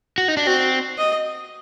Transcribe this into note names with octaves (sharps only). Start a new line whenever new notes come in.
F#4
D#4
D4
C4 F#4
D#5